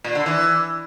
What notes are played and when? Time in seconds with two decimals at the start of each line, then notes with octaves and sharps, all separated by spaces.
0.04 A#2
0.15 D3
0.26 E3